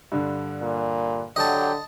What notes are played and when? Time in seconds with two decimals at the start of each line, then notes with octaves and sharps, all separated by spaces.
0.12 G2 D3
0.62 A#2
1.36 D3 F#3 G4 D#5 A5